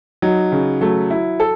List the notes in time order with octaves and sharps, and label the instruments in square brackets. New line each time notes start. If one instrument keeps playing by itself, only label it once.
[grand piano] F#3 [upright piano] D#4
[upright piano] C#3
[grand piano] F#3 [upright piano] A3
[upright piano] E4
A4